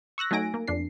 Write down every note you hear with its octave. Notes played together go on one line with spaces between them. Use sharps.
C#6 E6 F#6 A#6
F#3 A3 D#4 G#5 A#6 D7
A#3
F2 D4 C7